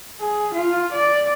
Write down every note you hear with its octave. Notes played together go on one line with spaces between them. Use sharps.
G#4
F4
D5